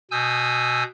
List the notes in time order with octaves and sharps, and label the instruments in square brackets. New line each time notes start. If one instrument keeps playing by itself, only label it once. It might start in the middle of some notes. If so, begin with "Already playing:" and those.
[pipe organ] B2 G#5 D#6 E6 G6